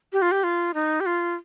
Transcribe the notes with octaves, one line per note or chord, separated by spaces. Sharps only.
G4
F4
G4
F4
D#4
G4
F4